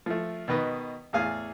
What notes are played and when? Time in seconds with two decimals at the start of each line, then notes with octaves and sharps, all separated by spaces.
0.06 F3 A3
0.48 B2 D#3 B4 D#5
1.13 E2 A2 G#4 F5 G#5